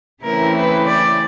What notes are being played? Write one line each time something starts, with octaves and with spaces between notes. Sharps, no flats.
C#3 E3 A3 C4 E4 A#4
B4
D5